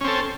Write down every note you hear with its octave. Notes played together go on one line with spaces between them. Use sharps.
C4 C#4 A4